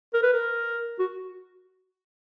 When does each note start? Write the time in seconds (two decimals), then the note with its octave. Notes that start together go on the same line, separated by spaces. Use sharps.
0.14 A#4
0.23 B4
0.33 A#4
0.99 F#4